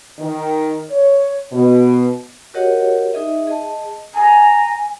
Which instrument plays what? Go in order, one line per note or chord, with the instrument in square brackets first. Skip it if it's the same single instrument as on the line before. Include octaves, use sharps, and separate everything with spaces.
[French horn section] D#3
C#5
B2
[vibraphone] F#4 G4 A#4 C#5 D#5 F#5
D#4 G#4 D#5 E5
G#4 D#5 A5
[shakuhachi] G#5 [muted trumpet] A#5